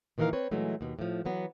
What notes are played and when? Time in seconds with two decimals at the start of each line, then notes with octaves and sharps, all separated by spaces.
0.18 A#2 D#3 E3 F#4 A#4 F5
0.33 C4 B4 C#5
0.51 A#2 E3 F#3 G#3 A3
0.81 D#2 B2
0.99 A2 F3
1.25 E3 F#3 B3